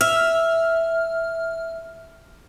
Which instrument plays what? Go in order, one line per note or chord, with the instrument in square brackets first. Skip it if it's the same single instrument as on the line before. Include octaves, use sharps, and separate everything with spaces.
[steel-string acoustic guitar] E5 [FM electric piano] F6